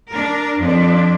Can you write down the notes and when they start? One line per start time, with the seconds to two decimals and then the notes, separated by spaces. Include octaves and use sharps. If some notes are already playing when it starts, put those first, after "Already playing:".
0.11 D4 A#4
0.60 F2 D4